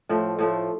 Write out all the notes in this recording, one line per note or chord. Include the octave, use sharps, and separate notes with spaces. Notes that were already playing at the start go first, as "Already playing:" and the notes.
A2 F3 A3
A2 F3 A3